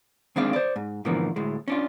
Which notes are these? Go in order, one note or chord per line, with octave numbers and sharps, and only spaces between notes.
D#3 G#3 C4 D4 D5 F5
C5 D5
G#2
G#2 B2 D3 E3 F3 A#3
D2 A2 G#3
C#4 D4 F4